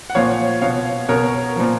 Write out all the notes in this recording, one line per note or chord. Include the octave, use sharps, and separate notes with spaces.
F#5
A#2 F3 C#5 F5
B2 C#5 F5
B2 A#4 C#5
A#2 F3